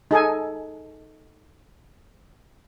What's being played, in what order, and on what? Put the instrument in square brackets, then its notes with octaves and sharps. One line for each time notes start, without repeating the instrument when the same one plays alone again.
[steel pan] D#4 G#4 A4 G#5